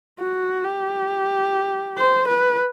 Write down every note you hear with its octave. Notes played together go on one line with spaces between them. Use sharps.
F#4
G4
C5
B4